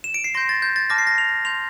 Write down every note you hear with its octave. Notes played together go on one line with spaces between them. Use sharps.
E7
D7
C7
C6 G6 A#6
A6
G6
A6
A5 D6 F6 A#6
C7
A#6
F7
C6 G6 F7